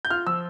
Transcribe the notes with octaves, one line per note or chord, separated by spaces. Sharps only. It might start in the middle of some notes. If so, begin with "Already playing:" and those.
G6
F4 F6
F3 E6